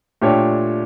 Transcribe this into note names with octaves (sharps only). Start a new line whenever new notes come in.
A#2 A3 D4 G4 C#5